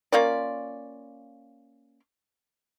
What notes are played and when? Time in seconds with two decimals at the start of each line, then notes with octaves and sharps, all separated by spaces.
0.12 A#3 C#4 F4 D5